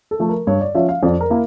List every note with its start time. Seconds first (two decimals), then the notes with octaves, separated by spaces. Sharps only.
0.11 A4
0.19 F3 A3
0.29 A#4
0.47 G2 C#5
0.61 D5
0.75 F3 C#4 F4 E5
0.89 F5
1.03 F2 D5
1.21 A#4
1.30 A#3 E4